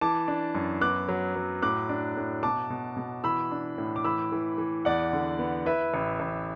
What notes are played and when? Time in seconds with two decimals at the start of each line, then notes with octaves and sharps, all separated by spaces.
0.01 E3 A5 D6
0.28 D4
0.55 F#2
0.81 B3 D6 F#6
1.09 F#3
1.35 F#3
1.62 A2 D6 F#6
1.89 D4
2.17 A2
2.43 B2 A5 D6
2.70 B2
2.97 B2
3.24 E3 B5 E6
3.51 D4
3.78 A2
3.96 D6
4.04 E3 B5 E6
4.32 E3
4.58 E3
4.85 E2 D5 F#5
5.13 D3
5.39 B3
5.66 E4 B4 E5
5.94 A1
6.20 A1